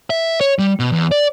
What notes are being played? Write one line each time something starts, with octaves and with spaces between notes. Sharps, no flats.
E5
C#5
G3
B2
E2
D5